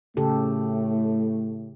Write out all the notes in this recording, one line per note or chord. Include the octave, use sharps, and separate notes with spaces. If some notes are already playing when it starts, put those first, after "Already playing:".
A2 C#3 A3 G4 A4